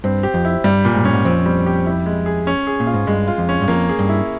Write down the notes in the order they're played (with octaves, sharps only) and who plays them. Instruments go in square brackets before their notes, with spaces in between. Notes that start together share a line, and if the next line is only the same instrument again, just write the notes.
[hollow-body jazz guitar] G2 [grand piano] C4
[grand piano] G4
[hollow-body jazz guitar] F2
[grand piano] E4
[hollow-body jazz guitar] G2 [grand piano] G3
[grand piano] A#2
[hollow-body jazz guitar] G#2
[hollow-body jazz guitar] G2 [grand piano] C#4
[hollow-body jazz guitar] G#2
[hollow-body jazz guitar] F2 [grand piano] C4
[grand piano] G3
G4
E4
G#3
G#4
C#4
G#4
[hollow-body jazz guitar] A#2
[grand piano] F4
[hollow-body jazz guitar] G#2
[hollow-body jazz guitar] G2 [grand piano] G#3
[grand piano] F4
[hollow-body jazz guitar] F2
[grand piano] C#4
[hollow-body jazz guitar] G2
[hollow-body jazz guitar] F2 [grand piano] A#3
[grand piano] G#4
[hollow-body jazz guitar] G2
[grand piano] E4